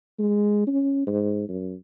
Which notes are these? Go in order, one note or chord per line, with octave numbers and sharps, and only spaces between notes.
G#3
C#4
G#2
F#2